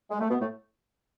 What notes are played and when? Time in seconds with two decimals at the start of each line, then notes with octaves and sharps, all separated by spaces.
0.11 G#3
0.20 A3
0.29 B2 B3
0.40 A2 A3